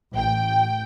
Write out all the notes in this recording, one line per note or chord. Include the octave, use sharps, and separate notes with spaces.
A1 G5